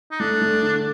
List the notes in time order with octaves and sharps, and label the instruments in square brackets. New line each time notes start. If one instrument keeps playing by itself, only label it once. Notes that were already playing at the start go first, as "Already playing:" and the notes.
[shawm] D#4
[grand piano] A3 [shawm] D4
[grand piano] A3
D3